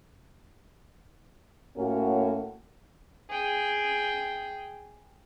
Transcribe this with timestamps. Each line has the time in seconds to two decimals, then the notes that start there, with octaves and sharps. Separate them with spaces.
1.76 A2 A#3 C#4 F#4 A#4
3.30 G#4 G5